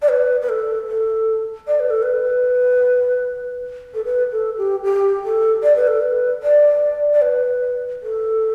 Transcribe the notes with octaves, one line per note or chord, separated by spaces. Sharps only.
D5
B4
B4
A4
A4
D5
B4
A4
B4
A4
B4
A4
G4
G4
A4
D5
B4
A4
B4
D5
D5
B4
A4